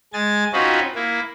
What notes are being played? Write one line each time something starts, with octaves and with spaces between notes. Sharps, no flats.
G#3 G#5 A6
C4 C#4 D#4 F4 F#4 B4
A#3 E4